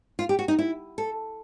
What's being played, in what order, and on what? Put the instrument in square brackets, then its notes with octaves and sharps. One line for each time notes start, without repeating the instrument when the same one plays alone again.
[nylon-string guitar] F4
G4
F#4
D#4
E4
A4